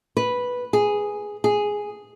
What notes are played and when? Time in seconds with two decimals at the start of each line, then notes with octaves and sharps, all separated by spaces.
0.17 B4
0.73 G#4
1.44 G#4